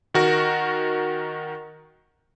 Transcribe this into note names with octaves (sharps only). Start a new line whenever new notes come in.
D#3 F#4 A#4